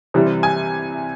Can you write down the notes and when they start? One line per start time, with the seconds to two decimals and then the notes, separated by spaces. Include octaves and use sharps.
0.14 C3 E3 G3 C4
0.43 G#5